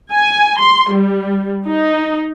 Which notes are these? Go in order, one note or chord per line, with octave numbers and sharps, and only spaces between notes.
G#5
C6
G3
D#4